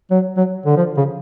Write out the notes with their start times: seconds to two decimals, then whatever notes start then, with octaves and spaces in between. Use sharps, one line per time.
0.11 F#3
0.37 F#3
0.66 D3
0.77 F3
0.97 C#3